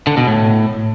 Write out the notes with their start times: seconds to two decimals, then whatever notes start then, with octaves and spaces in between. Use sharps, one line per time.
0.07 D3
0.17 B2
0.27 A2